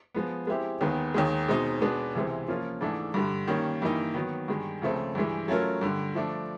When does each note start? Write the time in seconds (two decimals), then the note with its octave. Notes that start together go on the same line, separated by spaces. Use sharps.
0.14 F3 G#3 B3
0.47 G#3 C4 E4 G4
0.81 D#2 D#3 G#3 B3
1.14 D#2 D#3 G#3
1.48 B2 G#3 C4 D#4
1.81 B2 G#3 B3 D4
2.15 C#2 C3 E3 G#3 C4
2.48 F3 A#3 C#4 F4
2.81 G#2 E3 A3 D4
3.14 G2 D3 G3
3.47 D#3 G3 A#3 C#4
3.82 G2 E3 G3 A#3 D#4
4.14 D#3 F#3 B3
4.48 G2 D#3 G#3
4.82 C#2 C#3 F3 A3 C4
5.15 G2 E3 G#3
5.48 F#3 A3 C#4 F4 A#4
5.81 G2 D3 G3
6.15 F3 A3 D4